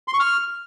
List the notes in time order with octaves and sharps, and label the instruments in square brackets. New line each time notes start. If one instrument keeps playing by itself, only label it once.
[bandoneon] C6
C#6
F6